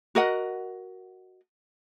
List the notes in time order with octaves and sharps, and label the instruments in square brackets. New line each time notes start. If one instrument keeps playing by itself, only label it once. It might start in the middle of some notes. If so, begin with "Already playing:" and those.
[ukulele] F#4 A#4 D#5 F#5